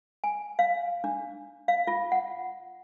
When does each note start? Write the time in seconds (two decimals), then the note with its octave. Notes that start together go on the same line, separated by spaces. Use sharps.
0.24 G#5
0.59 F5
1.04 D4
1.68 F5
1.87 F4
2.12 F#5